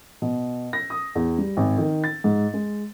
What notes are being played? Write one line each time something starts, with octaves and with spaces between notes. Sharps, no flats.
B2
A#6
D#6
E2
G3
G#1
D#3
A6
G#2
G#3